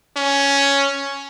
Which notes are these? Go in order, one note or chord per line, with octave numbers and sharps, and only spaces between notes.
C#4